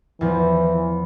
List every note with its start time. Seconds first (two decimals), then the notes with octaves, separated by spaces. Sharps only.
0.21 E2 E3 F3